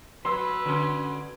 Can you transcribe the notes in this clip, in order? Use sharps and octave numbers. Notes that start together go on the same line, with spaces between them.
F#3 B4 C6 E6
D3 C#4